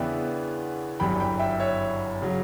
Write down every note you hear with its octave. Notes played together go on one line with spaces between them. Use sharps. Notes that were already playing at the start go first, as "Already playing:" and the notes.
Already playing: E2 C#3 E3 B3 D4 E5 G5
G1 F#2 E3 G3 G5 B5
G5 B5
E5 G5
C#5 E5
C#3 F#3